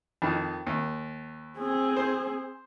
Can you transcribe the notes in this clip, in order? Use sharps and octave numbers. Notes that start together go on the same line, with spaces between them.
F2 D#3
D#2
C4 G#4
C5